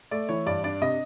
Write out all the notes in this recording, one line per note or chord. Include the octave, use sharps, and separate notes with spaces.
A3 D5
E3 C#5
G2 D5
D4 D5
C3 D#5